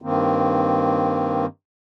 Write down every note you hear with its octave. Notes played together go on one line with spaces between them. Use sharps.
G2 D#3 A#3 C4